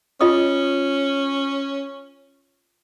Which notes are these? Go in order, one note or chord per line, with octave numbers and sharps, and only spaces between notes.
C#4 F4 D#5 D#6